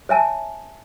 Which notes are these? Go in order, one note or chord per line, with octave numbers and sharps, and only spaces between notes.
C#5 E5 G#5 A5